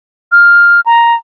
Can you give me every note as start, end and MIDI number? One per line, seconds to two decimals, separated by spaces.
0.32 0.80 89
0.86 1.15 82